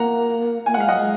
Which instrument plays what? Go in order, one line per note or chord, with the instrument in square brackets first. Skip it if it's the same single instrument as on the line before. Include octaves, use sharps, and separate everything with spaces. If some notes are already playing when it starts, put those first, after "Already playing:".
Already playing: [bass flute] A#3 [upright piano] F#5 A#5
[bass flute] A#3 [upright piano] G#5
[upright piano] F#5
[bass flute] G#3 [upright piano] F5
[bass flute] F#3 [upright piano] D#5 F#5
[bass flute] G#3